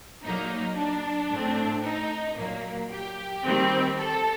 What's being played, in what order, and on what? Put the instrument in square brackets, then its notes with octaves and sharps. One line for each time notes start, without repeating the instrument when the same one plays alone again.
[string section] A#2 F#3 A#3 D#4
D4
A2 A3 C4
D#4
A#2 F#3 A#3
G4
D#3 G3 C4
A4